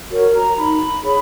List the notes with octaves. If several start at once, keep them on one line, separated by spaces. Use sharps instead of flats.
F#4 A#4 C#5
A#5
D#4 B5
G#4 C#5